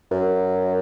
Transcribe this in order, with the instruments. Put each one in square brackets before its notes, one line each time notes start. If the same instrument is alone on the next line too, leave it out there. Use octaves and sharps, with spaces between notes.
[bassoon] F#2